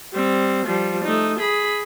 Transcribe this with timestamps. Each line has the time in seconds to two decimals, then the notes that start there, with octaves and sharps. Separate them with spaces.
0.13 G3 C4
0.66 F3 G3
1.04 A3 D#4
1.39 G#4 B5